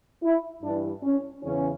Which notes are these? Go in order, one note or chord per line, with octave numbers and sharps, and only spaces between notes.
E4
G2 E3 D4
C#4
E2 C#3 E3 C#4